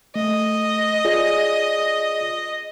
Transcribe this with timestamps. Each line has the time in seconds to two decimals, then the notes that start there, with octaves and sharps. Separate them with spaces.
0.16 A3 D#5
1.05 F4 G#4 D5